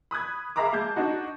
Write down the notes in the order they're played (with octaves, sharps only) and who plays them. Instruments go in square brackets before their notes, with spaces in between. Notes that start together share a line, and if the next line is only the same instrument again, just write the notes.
[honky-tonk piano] B5 D#6 F#6 G#6
G#4 E5 F5 A#5 B5 D6
G#3 A5 G6 G#6
D4 D#4 F#4